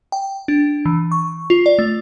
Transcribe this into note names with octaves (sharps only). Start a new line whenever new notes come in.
G5
D4
E3
C#6
F4
D5
A3